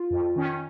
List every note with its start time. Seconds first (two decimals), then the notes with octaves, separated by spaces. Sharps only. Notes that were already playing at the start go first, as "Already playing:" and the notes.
Already playing: F4
0.11 F2
0.36 D#3 C#4